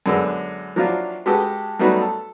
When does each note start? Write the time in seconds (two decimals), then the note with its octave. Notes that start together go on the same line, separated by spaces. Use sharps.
0.06 F#2 D3 G#3 B3 E6
0.76 F3 F#3 A#3 D4 E4 F4
1.26 G#3 F#4 G4 A4 B4 D#6
1.79 F#3 G3 A3 B3 D#4 F#4
2.01 A4